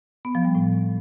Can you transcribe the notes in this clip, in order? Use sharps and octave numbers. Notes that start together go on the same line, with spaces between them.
B3
F3
G3
A2